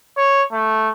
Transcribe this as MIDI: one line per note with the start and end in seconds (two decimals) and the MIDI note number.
0.17 0.43 73
0.52 0.90 57